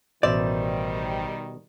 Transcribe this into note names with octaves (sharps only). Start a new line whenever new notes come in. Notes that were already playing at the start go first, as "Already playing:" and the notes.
A1 B2 D#3 G3 C5 D5 E5